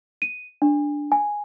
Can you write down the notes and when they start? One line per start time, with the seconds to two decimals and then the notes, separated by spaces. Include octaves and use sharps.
0.22 D#7
0.62 D4
1.12 G#5